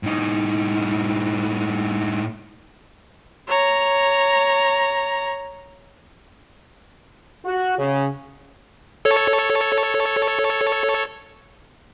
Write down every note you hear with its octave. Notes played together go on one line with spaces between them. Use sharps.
A2 D#4
C#5 A#5
F#4
C#3
A4 C#5